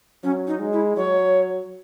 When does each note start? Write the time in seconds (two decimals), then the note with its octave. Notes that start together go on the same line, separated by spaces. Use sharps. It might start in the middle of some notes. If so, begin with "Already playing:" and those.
0.23 F#3 C#4
0.48 D#4
0.60 G#3
0.73 E4
0.97 F#3 C#5